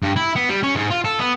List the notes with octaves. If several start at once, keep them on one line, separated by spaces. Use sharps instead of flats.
G2
E4
B3
G3
C#4
G#2
F4
A4
B3